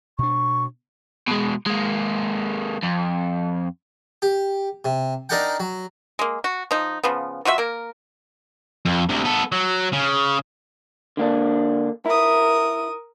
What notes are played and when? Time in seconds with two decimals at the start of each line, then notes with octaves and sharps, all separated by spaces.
0.19 B2 D4 C#6
1.27 B2 G#3
1.66 G#3 A#3
2.83 F2
4.22 G4
4.85 C3
5.29 D4 D#4 A#4 D5 F#5 G5
5.60 F#3
6.19 G#3 A#3
6.44 F#4
6.71 F3 D#4
7.03 C#3 F3 B3
7.45 F#3 F4 F#4 E5
7.58 A#3 A#4
8.85 F2
9.09 D2 C3
9.25 B3 A4
9.52 F#3
9.93 C#3
11.17 D3 A#3 D4
12.06 E4 A#4 D#6